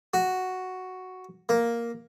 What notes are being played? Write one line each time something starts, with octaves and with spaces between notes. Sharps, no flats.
F#4
A#3